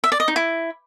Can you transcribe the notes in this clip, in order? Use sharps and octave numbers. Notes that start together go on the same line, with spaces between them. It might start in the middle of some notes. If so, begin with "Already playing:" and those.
E5
D5
D#5
D#4
E4